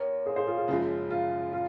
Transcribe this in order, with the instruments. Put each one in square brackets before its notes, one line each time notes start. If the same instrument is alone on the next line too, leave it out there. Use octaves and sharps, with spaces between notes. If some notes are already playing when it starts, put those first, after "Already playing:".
Already playing: [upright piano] D#2 [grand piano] A#4 C#5
[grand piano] G#4 C5
G#4 C5
F4 G#4
F4 G#4
[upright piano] F#1 F#2 C#3 F3 G#3
[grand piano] F4
F4